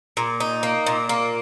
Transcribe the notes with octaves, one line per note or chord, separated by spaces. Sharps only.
A#2
D#4
A#3
A#2
A#3